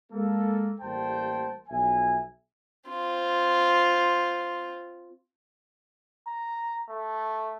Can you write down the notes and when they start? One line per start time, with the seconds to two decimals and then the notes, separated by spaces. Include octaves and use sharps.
0.12 G#3 A#3 A4
0.81 A1 G3 A#3 C5 G5 A5
1.69 B1 F3 E5 G#5
2.89 C4 F4
6.28 A#5
6.90 A3